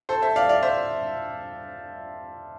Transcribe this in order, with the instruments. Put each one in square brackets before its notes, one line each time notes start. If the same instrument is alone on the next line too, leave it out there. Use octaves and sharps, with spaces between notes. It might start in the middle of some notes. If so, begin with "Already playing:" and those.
[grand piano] A4 C5
C5 E5
D5 F5
D5 F5
C5 E5